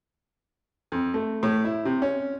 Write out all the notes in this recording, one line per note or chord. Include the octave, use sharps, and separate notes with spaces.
F2
A3
A2
E4
C3
C#4